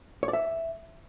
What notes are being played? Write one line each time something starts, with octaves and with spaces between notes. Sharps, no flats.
C#5
D5
E5